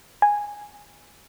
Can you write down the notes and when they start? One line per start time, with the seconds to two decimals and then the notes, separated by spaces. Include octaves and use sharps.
0.22 G#5